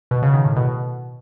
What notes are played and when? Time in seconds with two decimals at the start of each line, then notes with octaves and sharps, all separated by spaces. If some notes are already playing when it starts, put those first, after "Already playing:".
0.11 B2
0.22 C#3
0.34 D#3
0.45 A2
0.56 B2